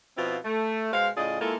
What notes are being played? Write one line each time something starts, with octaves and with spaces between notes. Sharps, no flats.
B2 F3 C4 E4 F4
A3
B2 G#3 C5 F5
A2 C#3 F4 G#4 D5 D#5
G#3 A#3 E4 F4 A4